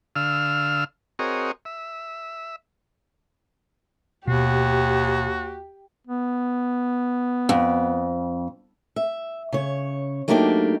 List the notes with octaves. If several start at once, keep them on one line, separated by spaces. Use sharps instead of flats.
D3 F5 E6 F6
C4 F#4 G#4 A#4 C#5 D#5
E5
D#2 B2 F#4 G4
B3
F2
E5
C#3 C#5
F#3 A3 A#3 D4 D#4 G4